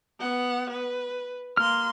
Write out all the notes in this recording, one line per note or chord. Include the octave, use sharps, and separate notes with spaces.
B3 F#5
B4
A#3 C6 F6